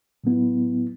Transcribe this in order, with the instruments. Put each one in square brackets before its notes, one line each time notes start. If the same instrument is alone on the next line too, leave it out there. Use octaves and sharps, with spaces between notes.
[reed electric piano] A2 F#3 B3 E4